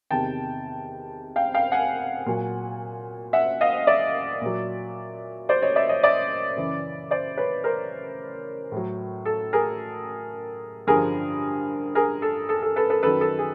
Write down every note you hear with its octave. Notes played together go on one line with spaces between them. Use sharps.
E2 C3 D#3 G5 A5
F5 G5
F5 G5
F#5 G#5
A#2 F#3
E5 F#5
D#5 F5
D5 E5
A#2 F#3
C5 D5
C#5 D#5
D5 E5
C#5 D#5
D5 E5
F#2 C#3 E3
C5 D5
B4 C#5
A#4 C5
A2 F#3
A4
G#4 A#4
G2 D3 F3 G#4 A#4
G#4 A#4
A4
A4
A4
A4 B4
A4 B4
F#2 D#3 F#3 A4 B4
A4
G#4